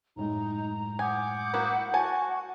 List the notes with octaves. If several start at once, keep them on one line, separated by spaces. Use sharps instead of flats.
F#2 A2 G#3 D#4 A#5
F#5 G#5 D6 D#6 G6
A#3 E4 F#4
F#4 G#5 A5 C#6